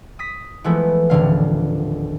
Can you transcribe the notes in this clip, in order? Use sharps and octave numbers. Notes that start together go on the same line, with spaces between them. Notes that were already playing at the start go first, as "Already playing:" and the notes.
D#6 A#6 B6
E3 F3 G#3 A3 B3 E4
D#1 A2 D3 F5